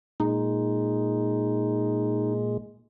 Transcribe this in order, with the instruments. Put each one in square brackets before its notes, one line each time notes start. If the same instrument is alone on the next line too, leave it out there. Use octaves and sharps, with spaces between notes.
[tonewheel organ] A#2 G#3 [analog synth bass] D#4